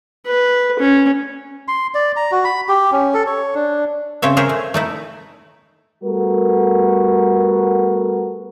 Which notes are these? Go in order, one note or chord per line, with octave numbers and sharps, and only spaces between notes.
B4
C#4
C6
D5
A#5
F#4
B5
G4
C#4
A4
C#5
D4
C#3 C4 C#5 E5
G#4 A#4 C5 C#5 E5
A3
A3 D#4 E4
G3 A3 B3 F#4 A4 A#4